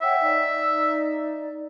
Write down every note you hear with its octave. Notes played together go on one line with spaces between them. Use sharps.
C#5 E5 F#5 G5
D#4 D5